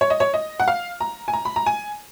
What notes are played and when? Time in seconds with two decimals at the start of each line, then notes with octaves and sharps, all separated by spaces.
0.01 C#5
0.10 D#5
0.20 C#5
0.34 D#5
0.60 F#5
0.68 F5
1.01 A#5
1.28 G#5
1.33 A#5
1.45 B5
1.56 A#5
1.66 G#5